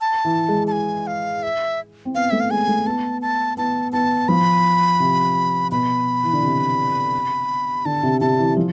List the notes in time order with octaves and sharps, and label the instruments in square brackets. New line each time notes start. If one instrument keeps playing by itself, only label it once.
[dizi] A5
[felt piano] E3
G#3
[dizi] A5
G#5
F5
E5
[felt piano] C4
[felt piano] B3 [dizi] F5
[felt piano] A3 [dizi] E5
[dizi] F5
[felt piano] G#3 [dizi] G#5
[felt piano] A3
[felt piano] B3 [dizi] A5
[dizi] A5
[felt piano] B3 [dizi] A5
[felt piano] B3 [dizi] A5
[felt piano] F3 [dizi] B5
[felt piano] C3
[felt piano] B2 [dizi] B5
[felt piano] E3
D3
C3
[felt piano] D3 [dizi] A5
[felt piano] C3
[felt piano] C3 [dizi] A5
[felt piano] E3
F3